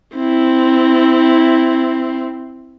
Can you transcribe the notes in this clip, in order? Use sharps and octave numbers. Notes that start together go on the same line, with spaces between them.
C4 E4